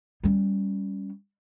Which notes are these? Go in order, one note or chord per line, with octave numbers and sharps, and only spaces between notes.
G3 C#4